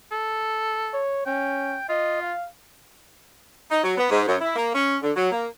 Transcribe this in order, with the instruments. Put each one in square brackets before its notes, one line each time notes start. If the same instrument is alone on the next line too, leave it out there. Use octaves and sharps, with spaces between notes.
[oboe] A4
[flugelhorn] C#5
[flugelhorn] C#4 [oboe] G5
[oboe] F4 [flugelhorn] D#5
[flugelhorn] F5
[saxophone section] D#4
F#3
B3
G#2
F#2
E4
A#3
C#4
D3
F#3
A#3